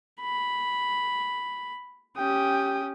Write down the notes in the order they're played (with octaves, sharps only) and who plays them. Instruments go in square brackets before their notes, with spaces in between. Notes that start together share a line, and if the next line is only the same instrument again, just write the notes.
[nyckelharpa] B5
[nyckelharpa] C#4 G4 [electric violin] G5 D#6